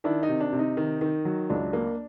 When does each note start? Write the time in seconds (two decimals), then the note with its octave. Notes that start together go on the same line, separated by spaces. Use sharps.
0.04 D#3 D4 E4
0.23 D#4
0.29 C3
0.41 D4
0.53 C3
0.59 D#4
0.77 D#3
1.01 D#3
1.25 F#3
1.50 C#2 D4
1.73 A#3